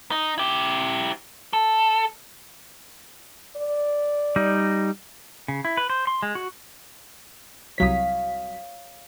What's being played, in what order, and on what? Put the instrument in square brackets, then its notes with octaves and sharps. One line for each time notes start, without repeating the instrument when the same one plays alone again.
[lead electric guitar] D#4
E4 G4
A4
[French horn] D5
[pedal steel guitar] G3 D#4
C#3
E4
B4
C5
C6
G#3
F#4
[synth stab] C2 F#3 B6 [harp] C#5 F5 D#6